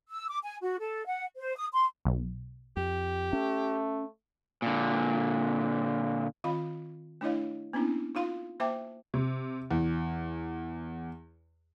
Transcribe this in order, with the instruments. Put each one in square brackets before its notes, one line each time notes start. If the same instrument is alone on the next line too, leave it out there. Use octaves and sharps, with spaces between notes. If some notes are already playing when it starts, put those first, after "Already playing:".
[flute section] E6
D6
G#5
F#4
A4
F#5
C5
D#6
C6
[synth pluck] B1
[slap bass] F2 [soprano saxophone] G4
[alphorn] A3 [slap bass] C#4
[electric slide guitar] A#2 D3
[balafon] D#3 C4 F4 D#5 F5 B5
A3 D4 E4 C#5 D#5 F5
A#3 B3 C#4 D4 E4
D#4 F4 F5 C6
A#3 C5 E5 G5 A5 D6
[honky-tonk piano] C3
E2